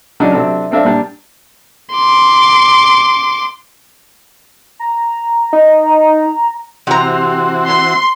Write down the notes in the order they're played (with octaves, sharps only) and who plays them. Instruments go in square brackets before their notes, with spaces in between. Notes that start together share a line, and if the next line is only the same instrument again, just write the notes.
[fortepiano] C#3 F#3 D4 D#4
C3 F#3 A3 C4 D4
A3 C4 D4 E5 F5
A#2 G3 D4
[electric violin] C6 D6
[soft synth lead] A#5
[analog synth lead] D#4
[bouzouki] C3 A#5 [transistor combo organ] E3 C4 F#4
[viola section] C6